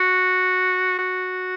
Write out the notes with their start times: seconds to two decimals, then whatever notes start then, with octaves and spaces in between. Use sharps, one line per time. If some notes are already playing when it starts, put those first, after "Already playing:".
Already playing: F#4
0.99 F#4